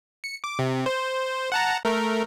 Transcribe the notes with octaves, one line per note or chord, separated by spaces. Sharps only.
C#7
D6
C3
C5
F#5 A5 A#5
A3 A#4